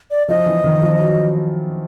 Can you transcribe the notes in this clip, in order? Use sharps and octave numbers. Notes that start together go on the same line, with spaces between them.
D5
F3 D#5
E3
D#3
F3
F#3